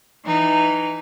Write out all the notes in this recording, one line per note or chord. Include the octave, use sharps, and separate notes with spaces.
E3 D#4